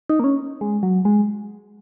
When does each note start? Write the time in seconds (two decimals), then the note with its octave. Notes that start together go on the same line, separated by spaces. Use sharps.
0.10 D#4
0.20 A#3
0.24 C#4
0.61 G#3
0.83 F#3
1.05 G#3